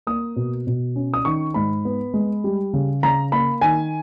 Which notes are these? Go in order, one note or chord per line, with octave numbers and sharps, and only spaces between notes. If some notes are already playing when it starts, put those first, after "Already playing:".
A#3 D#6
B2
B2
C#4
D#6
D#3 C#6
G#2 B5
B3
G#3
G3
C#3
C#3 A#5
A#3 B5
D#3 G#5